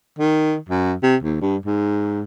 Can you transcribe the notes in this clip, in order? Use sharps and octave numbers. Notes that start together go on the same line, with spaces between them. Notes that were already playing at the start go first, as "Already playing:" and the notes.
D#3
F#2
C3
D#2
G2
G#2